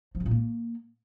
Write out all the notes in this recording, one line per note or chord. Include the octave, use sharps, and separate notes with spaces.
F3
C3
A#2
A#3